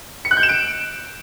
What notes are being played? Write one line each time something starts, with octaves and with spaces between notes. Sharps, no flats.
C#7
F#6
G6
E7
D7